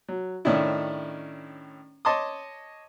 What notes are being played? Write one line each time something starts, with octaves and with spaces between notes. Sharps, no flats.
F#3
A2 D#3 C#4 D4 E4
C#5 D#5 A5 C6 D6 D#6